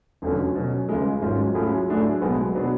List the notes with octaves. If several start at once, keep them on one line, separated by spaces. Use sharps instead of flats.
F1 F2 D3 F#3 C#4
B2 F#3 C#4
C#2 C#3 G#3
G#1 G#2 F#3 C#4 F4
A2 F#3 C#4 F4 G#4
A2 F#3 A3 D4 G#4
B1 B2 G#3 B3
B2 F#3 B3 D4